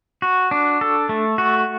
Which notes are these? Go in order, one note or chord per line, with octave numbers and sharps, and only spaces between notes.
F#4
D4
A4
A3
F#4